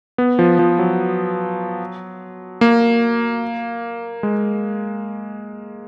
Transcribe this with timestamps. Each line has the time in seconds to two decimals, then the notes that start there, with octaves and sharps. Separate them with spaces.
0.18 B3
0.39 F3
0.59 F3
0.79 F#3
2.61 A#3
4.23 G#3